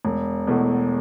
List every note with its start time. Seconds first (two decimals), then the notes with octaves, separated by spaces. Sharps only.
0.05 E1
0.47 E2 B2 A3